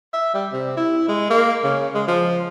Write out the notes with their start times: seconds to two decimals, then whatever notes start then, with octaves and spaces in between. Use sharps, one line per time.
0.13 E5
0.34 G3
0.53 C3
0.77 E4
1.08 G#3
1.30 A#3
1.64 C#3
1.94 G#3
2.08 F3